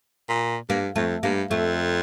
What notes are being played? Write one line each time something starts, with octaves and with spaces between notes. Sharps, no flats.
A#2
G2 A#3
F2 A3
G2 A#3
F2 A3